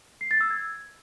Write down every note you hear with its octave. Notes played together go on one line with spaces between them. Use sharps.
C7
A6
E6
G#6